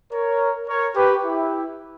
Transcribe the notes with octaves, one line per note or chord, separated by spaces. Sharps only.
A#4 C#5
A#4 C#5
G4 B4
E4 G4